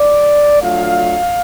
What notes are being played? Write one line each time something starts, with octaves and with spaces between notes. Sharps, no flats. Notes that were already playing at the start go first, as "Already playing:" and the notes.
Already playing: D5
F#3 A3 D4 F4 F5